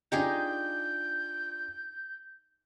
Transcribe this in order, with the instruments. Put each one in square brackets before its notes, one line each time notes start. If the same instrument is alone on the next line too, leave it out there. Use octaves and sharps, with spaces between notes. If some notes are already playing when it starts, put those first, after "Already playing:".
[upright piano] D4 F4 [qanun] D#4 G4 G#4 [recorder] G6